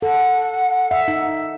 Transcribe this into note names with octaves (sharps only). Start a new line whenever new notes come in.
A4 F#5
E5
D#4